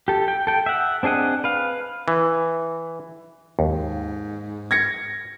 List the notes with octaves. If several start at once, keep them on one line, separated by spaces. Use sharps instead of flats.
G4 A4
G5
A4 G5
E5 F#5
C4 D4 G#4 D#5 F#5
B4 F5
E3
D#2 G#2
G#6 A#6 C#7